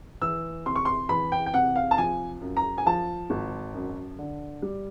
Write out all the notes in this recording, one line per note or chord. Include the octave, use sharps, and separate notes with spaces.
E3 E6
C3 C6
C#6
C6
E3 B5
G5
G5
C3 F#5
F5
A5
F3 G#5
F#2
A#5
G#5
F3 A5
G#1
F#2
D3
G3